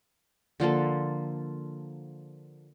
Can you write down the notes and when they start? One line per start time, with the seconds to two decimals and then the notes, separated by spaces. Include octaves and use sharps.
0.60 D3 F3 A#3 A4